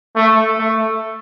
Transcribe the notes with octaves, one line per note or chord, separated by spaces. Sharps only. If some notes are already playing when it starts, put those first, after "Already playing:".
A3
A3